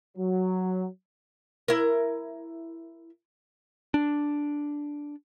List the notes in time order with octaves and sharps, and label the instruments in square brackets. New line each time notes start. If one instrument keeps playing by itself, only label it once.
[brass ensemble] F#3
[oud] E4 A#4
[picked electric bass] D4